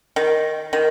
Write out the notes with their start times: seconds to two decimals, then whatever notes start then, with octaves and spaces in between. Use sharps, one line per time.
0.16 D#3
0.73 D#3